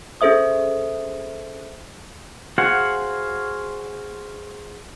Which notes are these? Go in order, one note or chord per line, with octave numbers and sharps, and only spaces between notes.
C#4 G#4 A4 C5 E5 D#6
F#4 G#4 C5 F5 F#5